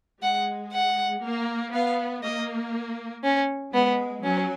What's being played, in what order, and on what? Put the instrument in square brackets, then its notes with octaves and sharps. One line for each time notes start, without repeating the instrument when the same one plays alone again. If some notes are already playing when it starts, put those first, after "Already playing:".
[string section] G#3 [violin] F#5
[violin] F#5
[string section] A#3
[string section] B3 [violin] F5
[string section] A#3 [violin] D#5
[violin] C#4
[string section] G#3 [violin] B3
[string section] F#3 [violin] C#4